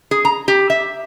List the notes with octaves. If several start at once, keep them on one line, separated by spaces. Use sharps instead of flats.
G#4
A#5
G4
E5